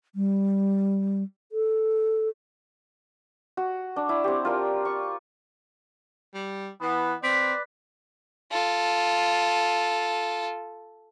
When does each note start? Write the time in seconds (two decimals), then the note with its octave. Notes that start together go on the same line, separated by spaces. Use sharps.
0.15 G3
1.52 A4
3.57 F#4
3.96 D4
4.09 E4
4.24 C4 G4
4.45 F4 A#4 D5
4.85 C#6
6.34 G3
6.81 E3 B3
7.23 C4 B4 D5 B6
8.51 F4 A4